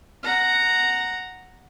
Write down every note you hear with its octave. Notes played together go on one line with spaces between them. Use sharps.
F#5 A#5